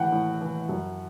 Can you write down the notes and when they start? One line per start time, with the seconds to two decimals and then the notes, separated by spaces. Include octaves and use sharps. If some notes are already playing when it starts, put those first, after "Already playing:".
Already playing: A2 E3 F#5 G5
0.12 A2
0.41 E3
0.69 F#2